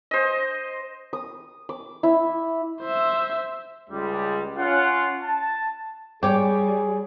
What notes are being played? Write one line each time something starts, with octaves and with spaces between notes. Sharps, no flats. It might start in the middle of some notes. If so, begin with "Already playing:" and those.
C5 D#5
D#6
D6
E4
C5 E5
C#2 G3 G#3
C#4 F4 F#5
A5
G3 G#4 C#5 G5 D6